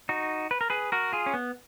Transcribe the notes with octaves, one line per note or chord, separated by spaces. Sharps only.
D#4 F#4
B4
A#4
G#4 B4
F#4 A#4
F4 G#4
C#4
B3